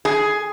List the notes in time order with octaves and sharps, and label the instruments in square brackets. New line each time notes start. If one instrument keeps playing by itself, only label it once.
[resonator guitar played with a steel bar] G#4